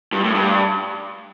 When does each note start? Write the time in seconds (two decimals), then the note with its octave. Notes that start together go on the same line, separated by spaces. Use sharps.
0.13 G2
0.24 A2
0.35 G2